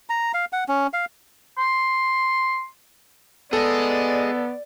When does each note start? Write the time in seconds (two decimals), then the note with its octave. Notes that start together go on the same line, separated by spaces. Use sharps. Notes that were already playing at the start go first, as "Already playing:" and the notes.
0.10 A#5
0.34 F5
0.53 F#5
0.68 C#4
0.93 F5
1.58 C6
3.53 B3 G#4 A4 D5 D#5